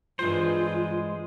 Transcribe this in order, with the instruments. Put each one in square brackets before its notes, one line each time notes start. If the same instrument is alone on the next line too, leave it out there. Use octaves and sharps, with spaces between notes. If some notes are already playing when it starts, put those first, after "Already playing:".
[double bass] G2 E3 [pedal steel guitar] G#3 C5 [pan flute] F4